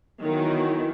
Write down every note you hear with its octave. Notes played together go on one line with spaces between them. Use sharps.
D#3 E3 F#3 B3 E4